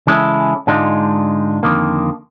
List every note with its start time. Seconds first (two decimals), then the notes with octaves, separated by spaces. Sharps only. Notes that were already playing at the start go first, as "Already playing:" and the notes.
0.07 C#3 E3 G#3 C#4 E4 A4
0.67 G#2 D3 G#3 D4 D#4 F4
1.63 F2 D3 D#3 A#3